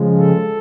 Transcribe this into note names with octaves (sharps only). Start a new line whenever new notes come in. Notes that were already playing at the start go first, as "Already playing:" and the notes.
Already playing: C#3 F3 G#3
A4